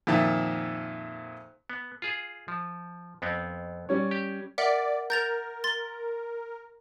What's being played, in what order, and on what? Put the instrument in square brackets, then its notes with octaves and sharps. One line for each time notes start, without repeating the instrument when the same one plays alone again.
[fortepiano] F2 A#2 D#3 E5 A5
[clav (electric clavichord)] B3
F4 G#4
F3
F2 B3 C4
[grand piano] G3 C#4 C#5
[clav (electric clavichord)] G4
[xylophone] A#4 E5 F#5 [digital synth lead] D5
[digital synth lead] A#4 [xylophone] G6 A6 F7
[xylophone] C6 A6